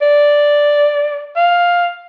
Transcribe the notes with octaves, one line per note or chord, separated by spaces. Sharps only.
D5
F5